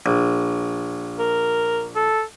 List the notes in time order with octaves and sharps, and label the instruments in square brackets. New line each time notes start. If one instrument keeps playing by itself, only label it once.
[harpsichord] A#1
[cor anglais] A#4
A4